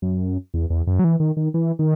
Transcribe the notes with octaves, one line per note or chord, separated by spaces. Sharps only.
F#2
E2
E2
F#2
F#3
E3
D#3
D#3
E3
D#3